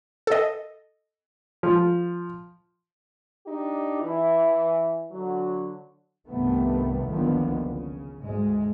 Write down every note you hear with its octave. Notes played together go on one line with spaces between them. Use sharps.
A4 D#5
F3
D4 D#4 G4
E3 E4
D3 F#3
C2 G2 C3 D#3 A3 B3
F#1 C#2 D3 D#3 F3 B3
C#3
D2 G#2 G#3